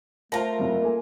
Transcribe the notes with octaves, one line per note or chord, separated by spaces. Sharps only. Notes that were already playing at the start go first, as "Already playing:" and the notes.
A3 F4 A#4 C5 A5 A#6
F#1 C2 F#3
A#3 A4 G#5